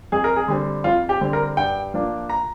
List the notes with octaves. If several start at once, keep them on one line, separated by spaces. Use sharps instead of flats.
F2 G#4
A#4
G#4
D3 G3 C4
F2 F4
G4
D3 G3 C4
A#4
G2 G5
F3 A#3 D4
A#5